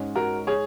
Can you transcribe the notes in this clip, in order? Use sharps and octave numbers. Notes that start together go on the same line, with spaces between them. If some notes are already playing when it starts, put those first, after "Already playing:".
Already playing: G#2 G#3 C#4
F#4 A#4
G#4 C#5